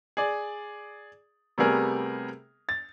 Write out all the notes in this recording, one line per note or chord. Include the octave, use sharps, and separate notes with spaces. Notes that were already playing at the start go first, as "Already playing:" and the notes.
G#4 D5
C3 G3 A3 B3 G#4 A#4
A6